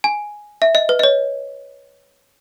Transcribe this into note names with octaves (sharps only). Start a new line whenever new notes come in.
G#5
E5
D#5
B4
D#5
C#5